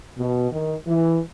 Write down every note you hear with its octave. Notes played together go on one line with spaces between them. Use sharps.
B2
D#3
E3